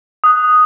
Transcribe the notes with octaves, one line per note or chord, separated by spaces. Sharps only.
D#6 F#6